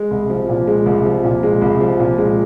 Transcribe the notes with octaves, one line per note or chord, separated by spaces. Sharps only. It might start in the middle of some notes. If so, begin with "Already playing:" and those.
Already playing: G#3
C2
F3
A#2
G#3
C2
F3
A#2
G#3
C2
F3
A#2
G#3